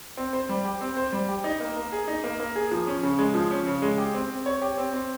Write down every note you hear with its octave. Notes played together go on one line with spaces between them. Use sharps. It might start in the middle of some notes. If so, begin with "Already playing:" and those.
C4
C5
G3
G4
C4
C5
G3
G4
D#4
A#3
A#3
G#4
D#4
A#3
A#3
G#4
F3
C#4
C#3
G#3
F3
C#4
C#3
G#3
G4
C4
C4
C#5
G4
C4
C4